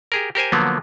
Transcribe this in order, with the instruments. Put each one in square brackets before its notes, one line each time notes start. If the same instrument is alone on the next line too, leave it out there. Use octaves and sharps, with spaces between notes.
[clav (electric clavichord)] G4 G#4 A#4
G4 A#4 C5 G#5
D3 F3 F#3 A#3 B3